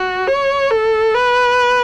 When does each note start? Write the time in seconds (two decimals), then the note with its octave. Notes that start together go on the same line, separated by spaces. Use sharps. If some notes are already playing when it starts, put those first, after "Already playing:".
Already playing: F#4
0.27 C#5
0.71 A4
1.15 B4